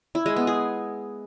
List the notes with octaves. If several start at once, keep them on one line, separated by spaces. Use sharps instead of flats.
E4
G#3
B3
G#4